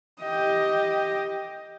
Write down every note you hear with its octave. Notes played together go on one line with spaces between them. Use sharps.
G4 D#5